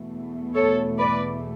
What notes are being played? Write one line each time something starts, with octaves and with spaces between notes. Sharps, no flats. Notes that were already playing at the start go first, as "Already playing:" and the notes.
Already playing: E2 B2 A3
A4 C#5
B4 D5